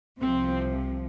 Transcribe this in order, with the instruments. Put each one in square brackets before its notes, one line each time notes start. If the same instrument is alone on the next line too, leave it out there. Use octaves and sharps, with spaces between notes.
[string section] C2 C3 F3 C4